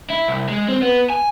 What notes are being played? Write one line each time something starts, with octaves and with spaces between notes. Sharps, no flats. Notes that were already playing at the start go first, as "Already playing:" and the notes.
E4
C2
G#3
C4
B3
G#5